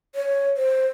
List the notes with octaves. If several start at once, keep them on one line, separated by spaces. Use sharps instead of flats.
C#5
C5